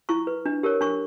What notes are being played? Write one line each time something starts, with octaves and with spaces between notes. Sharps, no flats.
E4 C#6
B4
D4
G4 A#4 C#5
D4 C#6